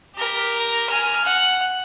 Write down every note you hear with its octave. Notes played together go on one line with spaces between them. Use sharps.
G4 A#4
G#5 F6
F#5